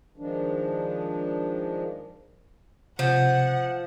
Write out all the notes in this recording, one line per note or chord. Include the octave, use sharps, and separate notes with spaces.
D#3 F3 G#3 D4
C3 F3 F#5